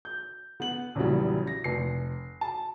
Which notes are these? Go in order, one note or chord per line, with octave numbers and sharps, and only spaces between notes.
G6
B3 F#7
A#1 E2 C#3 E3 F#3 G3
A#6
F1 C7
A5